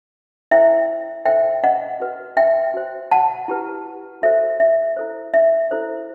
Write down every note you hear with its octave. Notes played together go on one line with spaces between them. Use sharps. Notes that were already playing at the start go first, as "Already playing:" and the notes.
E4 A4 C5 E5 G5
D#4 A4 C5 E5 G5
D#5 F#5
F#4 B4
E5 G5
F#4 C5
F#5 A5
E4 G4 B4
F#4 A4 C5 E5
E5
E4 A4 C5
E5
E4 A4 C5